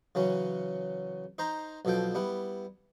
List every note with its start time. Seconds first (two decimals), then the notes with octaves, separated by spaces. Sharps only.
0.15 C#3 E3 F#3 C#4
1.38 D#4 C5 A#5
1.85 B1 B2 F3 A4 G5
2.15 G3 B3 E4